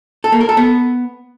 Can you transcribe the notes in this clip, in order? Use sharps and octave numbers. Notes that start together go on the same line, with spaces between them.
A4
A#3
A#4
A4
B3